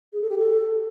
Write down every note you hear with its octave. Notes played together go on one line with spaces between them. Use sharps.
G#4
A4
G4
A4